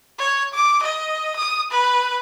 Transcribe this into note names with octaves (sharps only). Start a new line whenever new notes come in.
C#5
D6
D#5
D#6
B4